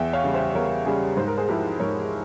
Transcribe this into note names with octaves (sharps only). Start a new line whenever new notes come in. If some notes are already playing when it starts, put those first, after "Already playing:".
Already playing: E2 E5 G5
C#5 F5
C#3 G3
C5 E5
E2 A#4 C#5
C#3 G3 G#4
G#2 C5
A#4
G#4 C5
F3 G#3 E4 G4 A#4
G#2 A#4 C#5